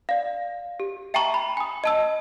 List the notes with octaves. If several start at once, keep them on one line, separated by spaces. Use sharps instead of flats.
D5 F5
G4
E5 G5 A5 A#5 C#6
B5
G#5 D#6
D#5 A5 E6